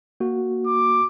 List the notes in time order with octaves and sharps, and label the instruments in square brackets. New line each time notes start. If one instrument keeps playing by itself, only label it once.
[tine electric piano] A#3 F#4
[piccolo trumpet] D6